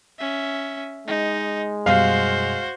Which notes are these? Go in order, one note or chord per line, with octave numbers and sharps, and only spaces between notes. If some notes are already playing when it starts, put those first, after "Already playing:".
C#4 E5
G#3 D#4
F#2 B2 G3 F#4 C5 F5